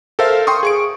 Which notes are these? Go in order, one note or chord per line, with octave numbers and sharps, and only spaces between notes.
A4 A#4 C5 E5 F5
G5 C6 C#6 D#6
G#4 C#6 D7